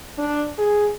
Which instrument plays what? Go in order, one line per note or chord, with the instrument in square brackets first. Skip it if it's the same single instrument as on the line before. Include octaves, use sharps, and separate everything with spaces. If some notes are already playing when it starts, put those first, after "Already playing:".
[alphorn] D4
G#4